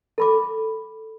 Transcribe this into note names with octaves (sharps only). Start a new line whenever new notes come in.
A4 B5 D6